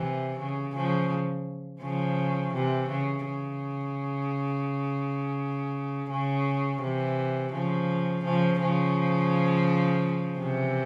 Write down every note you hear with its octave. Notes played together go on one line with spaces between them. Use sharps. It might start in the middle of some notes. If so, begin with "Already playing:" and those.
Already playing: C3 E3
C#3
C#3 F3
C#3 F3
C3 E3
C#3
C#3
C#3
C3 E3
C#3 F3
C#3 F3
C#3 F3
C3 E3